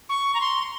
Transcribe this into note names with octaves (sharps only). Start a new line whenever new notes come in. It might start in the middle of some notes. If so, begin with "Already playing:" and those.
C#6
A#5
C6